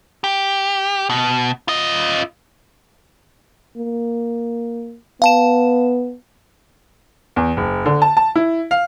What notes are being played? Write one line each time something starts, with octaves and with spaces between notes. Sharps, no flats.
G4
B2
F4 D#5
A#3
B3 F5 A5 E7
E2
F#1
D3
A5
A5
E4
F5